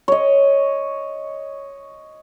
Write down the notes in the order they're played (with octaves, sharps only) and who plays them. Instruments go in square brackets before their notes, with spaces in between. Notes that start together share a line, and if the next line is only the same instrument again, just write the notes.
[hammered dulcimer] C#5 D#5